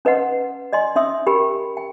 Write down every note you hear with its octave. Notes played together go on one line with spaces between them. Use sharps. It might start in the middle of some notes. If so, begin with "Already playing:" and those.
C#4 B4 D#5 F#5 C6
D5 D#5 G#5 C6
C#4 C#5 E5 C6 D#6 E6
G4 A#4 G5 B5
G5